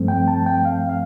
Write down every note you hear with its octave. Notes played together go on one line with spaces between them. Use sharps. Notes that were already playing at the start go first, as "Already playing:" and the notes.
Already playing: G2 F3 A3 C4
G5
A5
G5
F5
F5